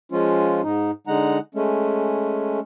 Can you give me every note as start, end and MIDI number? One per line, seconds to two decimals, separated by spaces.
0.12 0.61 53
0.12 0.61 56
0.12 0.61 61
0.12 0.61 65
0.63 0.91 44
0.63 0.91 63
1.07 1.38 50
1.07 1.38 56
1.07 1.38 63
1.07 1.38 78
1.07 1.38 82
1.55 2.60 56
1.55 2.60 57
1.55 2.60 61